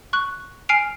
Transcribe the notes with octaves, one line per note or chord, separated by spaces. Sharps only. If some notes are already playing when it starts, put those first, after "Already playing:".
C#6 F#6
G#5 F6 C7 D7 F7